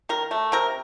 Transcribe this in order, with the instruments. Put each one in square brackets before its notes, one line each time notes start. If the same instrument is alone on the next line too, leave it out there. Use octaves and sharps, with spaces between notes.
[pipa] D#3 A#4
A3
C3 A#4